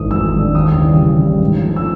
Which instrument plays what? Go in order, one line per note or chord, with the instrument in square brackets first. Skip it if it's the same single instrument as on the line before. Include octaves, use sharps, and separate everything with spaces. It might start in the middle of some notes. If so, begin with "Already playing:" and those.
Already playing: [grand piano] G#1 G#2 E3 A3 D4 D#6
G#1 E6
G#2 E3 A3 D4
D#2 D#6
C#3 E3 G3
D#2
C#3 E3 G3
G#2
F3 A3 C#4
E6